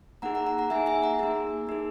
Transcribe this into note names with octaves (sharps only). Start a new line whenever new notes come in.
A#3 D#4 G#4 F#5 A#5
F#5 A#5
F#5 A#5
F#5 A#5
A#3 D#4 G#4 E5 G#5
E5 G#5
F#5 A#5
A#3 D#4 G#4
A#3 D#4 G#4